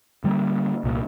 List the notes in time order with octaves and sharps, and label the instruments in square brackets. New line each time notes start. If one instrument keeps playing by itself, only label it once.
[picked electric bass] D3 G3 G#3 A#3
C2 A#2